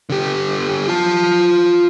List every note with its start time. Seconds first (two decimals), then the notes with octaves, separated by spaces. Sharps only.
0.10 D3 G4
0.88 F4 A5